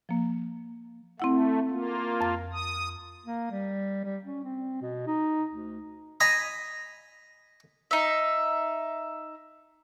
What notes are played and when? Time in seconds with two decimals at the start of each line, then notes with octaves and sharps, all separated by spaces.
0.09 F3 A#3
1.20 A3 C4 E4 F#5
1.70 A#3 F4
2.21 F2 A6
2.52 D#6
3.26 A#3
3.51 G3
4.04 G3
4.24 C#4
4.44 C4
4.81 B2
5.07 D#4
5.51 D2
6.20 D#5 G#5 A#5 B5
7.91 D#4 E5